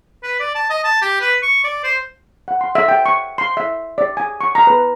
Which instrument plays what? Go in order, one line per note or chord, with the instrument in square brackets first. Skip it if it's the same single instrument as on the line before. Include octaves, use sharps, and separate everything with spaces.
[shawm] B4
D5
A5
D#5
A5
G4
B4
C#6
D5
C5
[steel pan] F#5
C6
E5
G5
C#6
C6
E5
D5
G#5
C#6
A#5
B4